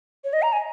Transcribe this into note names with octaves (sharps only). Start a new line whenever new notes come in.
C#5
D#5
A#5
G#5